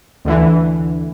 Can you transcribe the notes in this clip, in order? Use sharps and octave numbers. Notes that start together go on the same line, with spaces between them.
D2 D3 E3